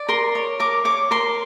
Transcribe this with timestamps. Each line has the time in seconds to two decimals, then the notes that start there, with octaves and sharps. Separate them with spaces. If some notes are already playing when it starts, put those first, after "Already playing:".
Already playing: D5
0.09 A#4 C6
0.35 C#5
0.60 A#4 D6
0.85 C#5 D6
1.11 A#4 C6